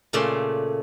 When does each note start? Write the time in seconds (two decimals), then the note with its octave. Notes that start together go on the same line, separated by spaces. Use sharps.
0.13 A#2 C#3 A3 D5 C6